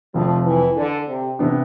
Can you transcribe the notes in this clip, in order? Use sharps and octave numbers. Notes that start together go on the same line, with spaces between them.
F1 F2 C3 F3
E3
D3
C3
C3 E3 B3 D4